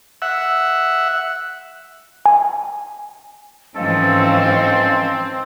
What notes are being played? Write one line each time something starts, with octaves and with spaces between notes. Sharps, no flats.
E5 F#5
G#5
G#2 E3 F3 C4 C#4 A4 D#5 F5